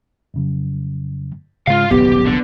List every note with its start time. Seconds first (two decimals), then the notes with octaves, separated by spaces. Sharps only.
0.34 F2 C#3 F#3
1.68 G#2 C#3 G#3 F4 F5
1.91 D#1 B1 C#3 B3 G4
2.26 D3